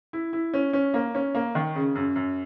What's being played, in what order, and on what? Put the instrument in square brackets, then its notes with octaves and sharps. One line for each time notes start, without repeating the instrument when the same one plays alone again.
[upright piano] E4
E4
C#4
C#4
A#3
C#4
A#3
D#3
C#3
F#2
F#2